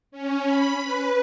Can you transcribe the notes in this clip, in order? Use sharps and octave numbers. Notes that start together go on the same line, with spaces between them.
C#4
B5
B4